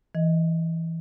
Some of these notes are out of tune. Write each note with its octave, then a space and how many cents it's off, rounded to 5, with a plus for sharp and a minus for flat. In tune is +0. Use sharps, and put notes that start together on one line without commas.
E3 +0 D#5 +0